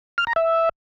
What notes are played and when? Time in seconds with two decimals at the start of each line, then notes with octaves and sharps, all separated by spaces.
0.18 F6
0.27 A#5
0.36 E5